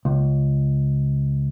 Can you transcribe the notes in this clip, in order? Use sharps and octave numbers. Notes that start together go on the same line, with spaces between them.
C#2